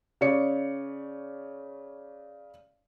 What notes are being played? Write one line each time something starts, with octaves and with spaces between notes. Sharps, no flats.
C#3 C#5 D5 C#7